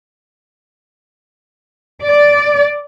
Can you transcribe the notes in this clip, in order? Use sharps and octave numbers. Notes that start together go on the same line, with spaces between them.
D5